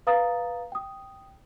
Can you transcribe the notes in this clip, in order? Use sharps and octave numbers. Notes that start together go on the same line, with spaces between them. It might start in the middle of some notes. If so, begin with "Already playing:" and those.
B4 F5 A#5 D#6 A6
G5 D#6